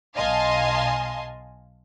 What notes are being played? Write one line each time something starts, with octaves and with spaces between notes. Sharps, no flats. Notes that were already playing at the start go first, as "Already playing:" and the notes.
B1 D#5 F5 G#5 A5 C6